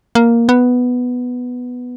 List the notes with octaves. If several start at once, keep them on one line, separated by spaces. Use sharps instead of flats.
A#3
B3